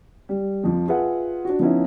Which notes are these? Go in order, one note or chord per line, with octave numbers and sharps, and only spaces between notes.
G3
F2 F3
F4 G#4 B4 E5 F#5
D4 F#4
F3 B3 C#4 D#4 E4